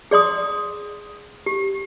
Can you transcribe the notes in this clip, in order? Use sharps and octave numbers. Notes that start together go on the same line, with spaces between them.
G#4 D5 C6 D#6
G4